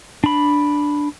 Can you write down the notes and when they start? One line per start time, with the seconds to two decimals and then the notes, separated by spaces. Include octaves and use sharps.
0.24 D4 B5